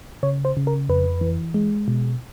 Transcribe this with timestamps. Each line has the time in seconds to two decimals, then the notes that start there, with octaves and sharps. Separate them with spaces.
0.23 C#3 C#5
0.45 C5
0.57 C#3
0.67 A#4
0.89 F2 B4
1.21 E3
1.54 G#3
1.88 B2